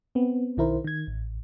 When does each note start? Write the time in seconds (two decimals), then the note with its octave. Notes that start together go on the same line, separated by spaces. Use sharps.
0.15 B3 C4
0.57 B1 D#3 E4 A#4 C5
0.85 D#3 G#6
1.07 A1